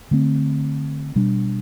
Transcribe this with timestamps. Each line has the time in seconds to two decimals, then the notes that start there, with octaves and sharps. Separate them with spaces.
0.11 D3 A3 C4
1.15 B2 G3 D4